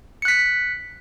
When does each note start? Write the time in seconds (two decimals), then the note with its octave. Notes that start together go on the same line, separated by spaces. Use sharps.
0.22 C#7
0.25 F#6
0.28 B6